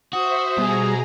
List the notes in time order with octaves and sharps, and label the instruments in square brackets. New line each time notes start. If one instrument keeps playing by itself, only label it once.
[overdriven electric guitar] F#4 [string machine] C5 E5 [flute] D#6
[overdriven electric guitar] B2 [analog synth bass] G3 [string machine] G#4 G#5 A#5